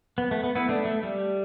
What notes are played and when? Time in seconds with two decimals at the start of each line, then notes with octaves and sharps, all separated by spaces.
0.18 B3
0.31 A3
0.44 B3
0.55 B3 E4
0.69 A3 D4
0.85 A3
1.03 G3